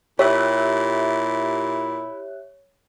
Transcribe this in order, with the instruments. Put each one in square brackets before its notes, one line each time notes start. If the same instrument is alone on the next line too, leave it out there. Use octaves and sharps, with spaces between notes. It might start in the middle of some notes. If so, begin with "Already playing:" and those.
[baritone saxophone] A#2 [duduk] E4 [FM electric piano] G4 E5 F#6 [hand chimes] C#5